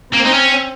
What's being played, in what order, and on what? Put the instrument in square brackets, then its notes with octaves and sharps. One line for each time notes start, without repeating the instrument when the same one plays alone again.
[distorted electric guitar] A#3 [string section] C4
[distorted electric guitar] D#4
C#4